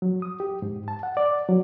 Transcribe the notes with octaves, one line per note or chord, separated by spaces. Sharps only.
F#3
D#6
G4
G#2
A5
F#5
D5
F#3